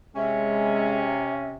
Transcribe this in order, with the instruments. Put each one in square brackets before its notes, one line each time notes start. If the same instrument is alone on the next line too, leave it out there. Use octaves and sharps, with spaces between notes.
[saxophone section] C3 C#4 [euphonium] G#3 [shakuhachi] E5